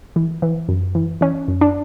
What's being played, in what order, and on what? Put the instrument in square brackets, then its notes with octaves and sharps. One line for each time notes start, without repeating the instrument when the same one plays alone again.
[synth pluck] E3
E3
F#2
E3
E3 C#4
F#2
D4